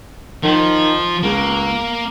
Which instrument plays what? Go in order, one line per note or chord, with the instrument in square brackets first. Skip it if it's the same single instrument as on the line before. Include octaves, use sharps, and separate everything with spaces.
[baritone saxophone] D#3 [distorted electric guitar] F3
[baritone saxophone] C#2 [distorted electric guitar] A#3